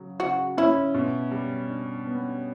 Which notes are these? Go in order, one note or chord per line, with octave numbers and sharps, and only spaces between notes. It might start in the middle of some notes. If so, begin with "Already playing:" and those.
Already playing: C#3 F#3
C#3 F#4
C#4 E4
B2
G3
D4
B3